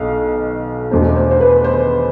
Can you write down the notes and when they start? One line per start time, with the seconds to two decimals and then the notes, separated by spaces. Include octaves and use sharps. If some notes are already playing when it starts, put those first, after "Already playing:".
Already playing: B1 B2 F5
0.91 E2 B2 A3 D4 C5
1.16 C5
1.31 C5
1.40 B4
1.64 C5